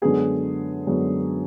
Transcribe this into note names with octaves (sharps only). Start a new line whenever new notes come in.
F#2 D3 G#3 B3 G#4
F#2 D3 G#3 B3